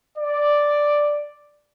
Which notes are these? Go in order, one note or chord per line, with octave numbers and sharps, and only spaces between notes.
D5